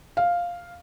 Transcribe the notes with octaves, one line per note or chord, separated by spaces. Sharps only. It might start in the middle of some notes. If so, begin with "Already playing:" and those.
F5